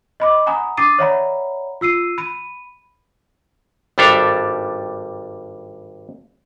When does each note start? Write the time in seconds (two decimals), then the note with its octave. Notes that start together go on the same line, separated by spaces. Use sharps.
0.20 D#5 B5 D6
0.46 F#5 G#5 A#5 B5 D#6
0.77 D4 D6 D#6 A6 C7 D#7
0.99 C#5 D5 E5 F#5 A#5 B5
1.81 F4 E6 C7 D#7
2.18 B5 D#7
3.98 G#1 G2 G3 D4 A4 F5